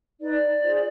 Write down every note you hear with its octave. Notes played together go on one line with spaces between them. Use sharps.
D#4 B4 D5
F4 G#4 C5